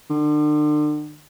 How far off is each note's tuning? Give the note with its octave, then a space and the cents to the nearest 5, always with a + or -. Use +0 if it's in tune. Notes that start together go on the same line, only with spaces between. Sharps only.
D3 +35